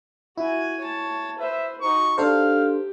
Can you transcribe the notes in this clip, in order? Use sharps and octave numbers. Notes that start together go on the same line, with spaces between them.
E4 F#4 G#5
C#5 A5
B4 C5 E5
D#4 F#4 C#6
D4 G4 A4 C5 F5